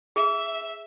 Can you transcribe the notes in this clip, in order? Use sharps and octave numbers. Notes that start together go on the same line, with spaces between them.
G#4 E5